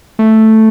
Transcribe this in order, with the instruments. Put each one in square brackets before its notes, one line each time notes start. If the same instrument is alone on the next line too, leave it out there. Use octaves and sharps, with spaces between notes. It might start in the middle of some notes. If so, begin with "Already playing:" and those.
[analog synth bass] A3